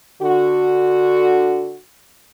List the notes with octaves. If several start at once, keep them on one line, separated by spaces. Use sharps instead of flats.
D3 F#4